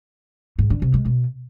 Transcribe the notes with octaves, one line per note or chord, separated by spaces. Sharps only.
G#2
D3
C3
G#3
B2